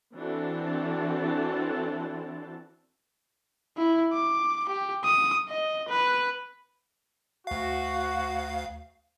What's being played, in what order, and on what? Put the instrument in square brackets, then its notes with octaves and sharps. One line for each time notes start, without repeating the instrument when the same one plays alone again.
[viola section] E3 C4 D4 F#4 A4 A5
[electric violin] E4
D6
G4
D#6
D#5
B4
[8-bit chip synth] D2 F5 [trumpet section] F#4